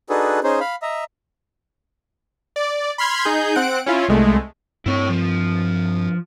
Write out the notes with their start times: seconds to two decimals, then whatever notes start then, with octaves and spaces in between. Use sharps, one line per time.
0.10 D4 D#4 F#4 G#4 A4 B4
0.43 C#4 D#4 G#4 C5
0.60 F5 B5
0.82 D#5 E5 A#5
2.56 D5
2.98 B5 C6 F6 G#6
3.25 D#4 G#4 G6
3.55 C4 F#5 F#6 D7
3.86 C#4 E4 F4
4.08 C2 G#3 A3
4.86 G2 C4 E4 C#5
5.09 F3